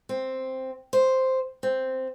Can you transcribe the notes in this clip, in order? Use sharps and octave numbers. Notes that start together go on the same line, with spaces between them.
C4
C5
C4